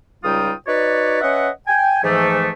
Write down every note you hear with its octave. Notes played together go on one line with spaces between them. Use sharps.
C#2 G3 D#4 F4 G5 D#6
D#4 F#4 B4 C#5 D5
C#4 B4 D#5 E5 F#5
G5 G#5
G#2 E3 F3 A3